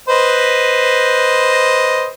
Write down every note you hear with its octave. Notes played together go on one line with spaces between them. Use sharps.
B4 C5 D#5